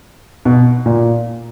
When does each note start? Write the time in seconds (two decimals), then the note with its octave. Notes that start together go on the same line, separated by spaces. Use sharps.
0.45 B2
0.86 A#2